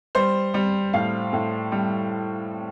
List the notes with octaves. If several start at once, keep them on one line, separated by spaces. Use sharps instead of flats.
G3 C5
G3
A2 F5
A2
G3